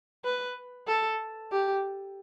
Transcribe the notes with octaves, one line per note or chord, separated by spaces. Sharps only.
B4
A4
G4